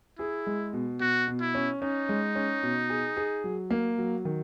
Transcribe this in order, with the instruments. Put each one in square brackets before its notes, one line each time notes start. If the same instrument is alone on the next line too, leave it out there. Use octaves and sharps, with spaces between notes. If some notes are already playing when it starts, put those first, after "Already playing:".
[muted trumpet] E4 [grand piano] G#4
[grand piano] G#3
B2
[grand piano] B2 [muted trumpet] F#4
[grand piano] B2
[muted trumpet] E4
[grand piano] C#4
[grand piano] C#4 [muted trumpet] D#4
[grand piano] G#3
C#4
B2
G#4
G#4
F#3
A#3
F#3
D#3